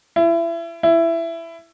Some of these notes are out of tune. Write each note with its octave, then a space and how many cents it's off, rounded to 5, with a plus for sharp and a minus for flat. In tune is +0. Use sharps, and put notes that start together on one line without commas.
E4 +30
E4 +15